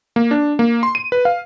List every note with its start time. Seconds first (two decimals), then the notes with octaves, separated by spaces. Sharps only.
0.16 A#3
0.31 D4
0.59 A#3
0.83 C6
0.95 D#7
1.12 B4
1.25 F5